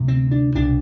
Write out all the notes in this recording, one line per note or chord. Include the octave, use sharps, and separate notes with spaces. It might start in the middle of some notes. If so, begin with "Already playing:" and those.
Already playing: D2 C3
C4
D4
C2 B2 D4